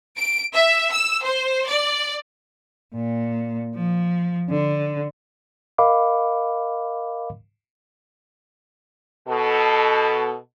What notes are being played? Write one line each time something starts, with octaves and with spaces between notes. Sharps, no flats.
D7
E5
E6
C5
D5
A#2
F3
D3
A#4 D#5 F5 B5 D6
B2 A4